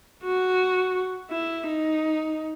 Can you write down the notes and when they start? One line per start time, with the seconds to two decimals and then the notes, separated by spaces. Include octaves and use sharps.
0.24 F#4
1.30 E4
1.67 D#4